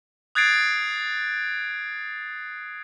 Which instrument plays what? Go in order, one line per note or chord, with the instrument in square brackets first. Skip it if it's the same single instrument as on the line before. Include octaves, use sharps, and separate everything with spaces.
[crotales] D#6 F#6 G#6 A6 C7 D7